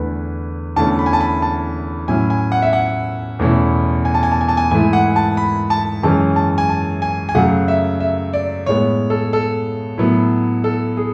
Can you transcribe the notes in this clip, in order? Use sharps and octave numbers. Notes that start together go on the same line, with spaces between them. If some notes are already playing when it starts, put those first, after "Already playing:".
Already playing: E2 D3 A3 E4 B4
E2 D3 A3 C#4 A5
B5
G#5
A5
B5
A5
A2 F#3 C#4 E4 G#5
G#5
F#5
E5
F#5
E2 B2 A3 C#4 E4
G#5
A5
G#5
A5
G#5
A5
G#5
G#2 E3 A3 E4 G#5
F#5
A5
B5
A5
F#2 E3 G#3 C#4 A5
A5
G#5
A5
G#5
G#5
F#2 C#3 F#3 A3 F#5
E5
E5
D5
A2 G#3 B3 C#5
A4
A4
A2 F#3 B3 E4
A4
G#4